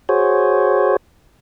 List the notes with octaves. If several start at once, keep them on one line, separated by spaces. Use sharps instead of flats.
F#4 G#4 C5 C#5